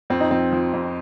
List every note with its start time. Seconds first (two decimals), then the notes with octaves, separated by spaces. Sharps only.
0.10 F2 C4
0.20 D#4
0.31 F3 C4
0.52 F3
0.73 F2